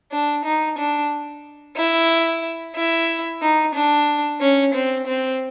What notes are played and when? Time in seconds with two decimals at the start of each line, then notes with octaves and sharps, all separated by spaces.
0.12 D4
0.45 D#4
0.78 D4
1.77 E4
2.76 E4
3.42 D#4
3.75 D4
4.40 C#4
4.74 C4
5.07 C4